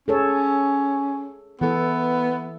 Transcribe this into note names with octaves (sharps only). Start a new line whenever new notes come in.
C#4 G#4 A4 C#5
E3 B3 A4